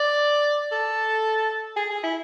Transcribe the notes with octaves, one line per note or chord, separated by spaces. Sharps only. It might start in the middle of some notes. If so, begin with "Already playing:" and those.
Already playing: D5
A4
G#4
G#4
E4